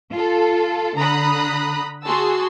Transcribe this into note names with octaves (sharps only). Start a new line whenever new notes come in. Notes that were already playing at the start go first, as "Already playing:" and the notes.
F4 A4
D3 A#5 B5 D#6 F#6
F#4 G#4 A5 C6 E6